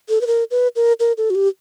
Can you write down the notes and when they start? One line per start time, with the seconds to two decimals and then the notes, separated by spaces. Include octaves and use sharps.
0.09 A4
0.21 B4
0.27 A#4
0.51 B4
0.76 A#4
1.00 A#4
1.18 A4
1.30 F#4
1.35 G4